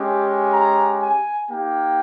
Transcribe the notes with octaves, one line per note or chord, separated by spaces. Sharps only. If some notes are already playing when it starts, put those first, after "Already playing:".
Already playing: G#3 C#4 G4
A#5
G#5
A#3 D#4 G4 G5